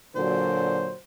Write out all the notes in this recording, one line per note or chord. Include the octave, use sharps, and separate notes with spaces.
A#2 D3 F#3 C5